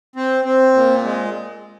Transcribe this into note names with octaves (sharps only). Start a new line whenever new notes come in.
C4
C4
A#2
G#3